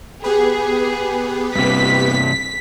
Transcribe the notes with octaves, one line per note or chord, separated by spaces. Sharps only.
B3 G4 G#4 B4
G2 C3 B6